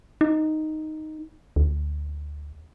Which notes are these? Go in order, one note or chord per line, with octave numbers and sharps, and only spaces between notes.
D#4
D2